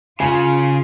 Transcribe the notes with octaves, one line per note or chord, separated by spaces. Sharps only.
C#3 F4 G#5